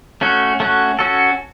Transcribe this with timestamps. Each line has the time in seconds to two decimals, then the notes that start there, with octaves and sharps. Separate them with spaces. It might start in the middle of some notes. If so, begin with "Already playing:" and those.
0.21 A3 C#4 F#4
0.60 A3 C#4 F#4
0.99 C#4 F#4 A4